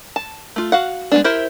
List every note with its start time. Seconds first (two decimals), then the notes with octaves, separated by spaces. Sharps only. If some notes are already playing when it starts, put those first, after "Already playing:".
0.16 A5
0.56 A3 F4
0.72 F#4 F5 F#5
1.12 G#3 B3 D4
1.24 E4 G4 A#4 C5 E5